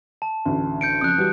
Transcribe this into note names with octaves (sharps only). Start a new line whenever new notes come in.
A5
A1 D2
G6 C#7 D7
F#1 F2 D#6 F#6
E3 G3 F#4